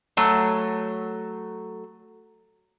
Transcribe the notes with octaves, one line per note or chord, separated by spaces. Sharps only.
F#3 A3 C#5